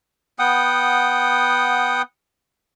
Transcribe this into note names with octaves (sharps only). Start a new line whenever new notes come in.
B3 F#5 G5 D#6